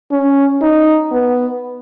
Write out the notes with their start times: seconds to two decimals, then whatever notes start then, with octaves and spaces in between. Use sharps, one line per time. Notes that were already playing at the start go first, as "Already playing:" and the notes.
0.11 C#4
0.61 D#4
1.12 B3